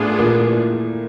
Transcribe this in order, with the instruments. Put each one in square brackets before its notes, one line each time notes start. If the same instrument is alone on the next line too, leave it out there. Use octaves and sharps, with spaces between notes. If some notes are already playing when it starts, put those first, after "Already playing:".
Already playing: [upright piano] A2 A3 [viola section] B3 D4 F4 G#4
[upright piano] A#2 A#3